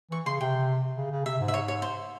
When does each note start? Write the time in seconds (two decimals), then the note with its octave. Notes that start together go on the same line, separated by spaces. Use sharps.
0.11 E3 C#6
0.26 C#3 C6
0.41 C3 G5
0.97 C#3
1.11 C#3
1.25 C3 E5
1.40 G#2
1.48 E5
1.54 C#5
1.68 C#5
1.82 C5